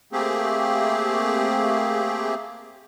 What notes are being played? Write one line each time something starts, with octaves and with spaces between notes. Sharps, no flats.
A3 A#3 C4 G4 G#4